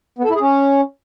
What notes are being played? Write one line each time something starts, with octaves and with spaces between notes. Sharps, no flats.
B3
A4
E4
G#4
C#4